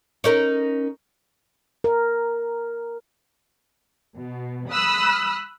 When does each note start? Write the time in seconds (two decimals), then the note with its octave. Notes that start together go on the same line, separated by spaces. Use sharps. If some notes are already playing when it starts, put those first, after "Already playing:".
0.24 C#4 D#4 A#4
1.84 A#4
4.16 B2
4.71 B5 D#6 E6 F#6